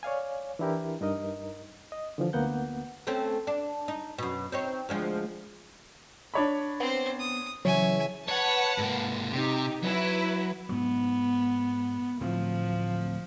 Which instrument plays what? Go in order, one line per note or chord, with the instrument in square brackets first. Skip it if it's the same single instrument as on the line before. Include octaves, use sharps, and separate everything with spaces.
[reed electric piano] C#5 D5 F5 G#5
E3 D4 E4 G4 A#4
G2 D#4 A#4 D#5
D#5
D3 E3 F3
D2 A#3 B3 F#5 G6
[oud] A3 C4 C#4
D4
D#4
F#2 B2
C4 D#4 C#5
D2 F3 G#3
[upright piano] D4 C#5 B5
[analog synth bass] B3 [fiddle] C4 C5
[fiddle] D#6
[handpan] C#3 E3 C#5 [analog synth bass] F#3 [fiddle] E5 G#5
[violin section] B4 F#5 A5 [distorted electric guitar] C#5
[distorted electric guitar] G#2 A#3
[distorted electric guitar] C3 [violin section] D#4 G4
[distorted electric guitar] F#3 [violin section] E4 B4
[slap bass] G#2 F#3 [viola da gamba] B3
[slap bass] D1 A2 C4 [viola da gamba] F3